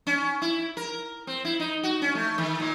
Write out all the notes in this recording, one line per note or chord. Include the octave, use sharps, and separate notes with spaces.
C#4
E4
A#4
C4
E4
D#4
F#4
C#4
A3
D#3
A#2